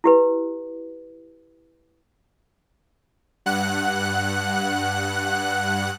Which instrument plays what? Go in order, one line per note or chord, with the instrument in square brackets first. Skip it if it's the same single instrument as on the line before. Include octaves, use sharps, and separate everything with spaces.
[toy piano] E4 G4 B4
[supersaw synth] G2 F#5 F#6